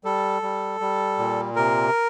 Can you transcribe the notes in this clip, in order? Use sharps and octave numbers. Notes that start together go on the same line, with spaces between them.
G3 A4
G3
G3
A#2
C3 A#4